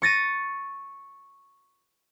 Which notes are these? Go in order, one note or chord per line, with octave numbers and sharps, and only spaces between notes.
C#6 A6 A#6 D#7